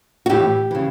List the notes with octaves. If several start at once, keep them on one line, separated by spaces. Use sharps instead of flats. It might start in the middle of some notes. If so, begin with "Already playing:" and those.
F#4
A2 E3 G4
C#3 E3